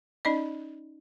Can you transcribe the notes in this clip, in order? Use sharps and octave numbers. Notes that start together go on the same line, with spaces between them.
C#4 D#4 D5 D#5